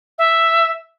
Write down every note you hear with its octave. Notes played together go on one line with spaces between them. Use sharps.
E5